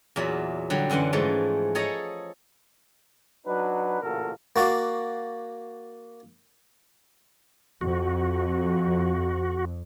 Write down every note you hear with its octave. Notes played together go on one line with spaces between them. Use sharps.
E2 A#2 F#3 E5
D3 F#3 G3
F#2 D3 E3 F#5 C6
G#2 E3 F3 G#3 A3
G#4 A4 C#5 D#5 A#5
F#3 D4 D#4 F#4 B4
A1 A#2 C#3 F#4 A4 A#4
A#3 F#4 D5 F5
F2 F#4